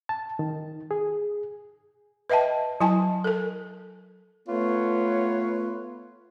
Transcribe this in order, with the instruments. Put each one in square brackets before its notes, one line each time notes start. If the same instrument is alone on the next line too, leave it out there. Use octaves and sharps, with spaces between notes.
[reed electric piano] A5
D#3
G#4
[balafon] B4 D#5 E5 G5 A5
F#3 E4 G#5 A5
A4 A#4
[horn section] A3 B3 F4 B4 C#5